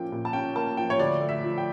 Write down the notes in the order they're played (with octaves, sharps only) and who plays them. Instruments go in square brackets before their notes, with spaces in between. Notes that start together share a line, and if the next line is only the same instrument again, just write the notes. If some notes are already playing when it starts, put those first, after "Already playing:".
Already playing: [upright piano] A#2 F3 A#3 C#4 G5
A#2
A5
C#4 G5
A#3 A5
F3 G5
C#5
D2 D5
A3
E5
F3
G5